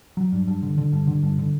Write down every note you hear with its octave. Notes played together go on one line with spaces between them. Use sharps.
F#3
G2
G2
D3
D3
G2
D3
G2
D3